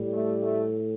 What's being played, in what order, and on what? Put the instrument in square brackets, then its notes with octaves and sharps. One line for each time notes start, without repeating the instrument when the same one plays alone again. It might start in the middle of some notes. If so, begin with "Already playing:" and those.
Already playing: [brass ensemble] A2 G3
A3
A3